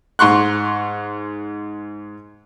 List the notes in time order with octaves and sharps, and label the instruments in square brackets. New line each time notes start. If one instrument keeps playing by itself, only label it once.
[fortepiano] G#2 C6 C#6 F#6